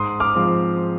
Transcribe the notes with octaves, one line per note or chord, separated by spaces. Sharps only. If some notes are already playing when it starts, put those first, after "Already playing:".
Already playing: G#2 C6 D#6
D6 F6
F3 G#3 C4